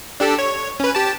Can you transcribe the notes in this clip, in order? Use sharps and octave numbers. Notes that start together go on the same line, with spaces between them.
D4 G4 A4
C#5
C#4 B4
G4 A5